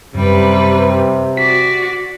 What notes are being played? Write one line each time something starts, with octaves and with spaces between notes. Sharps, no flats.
F#2 C3 G3 B4
F#4 D5 B6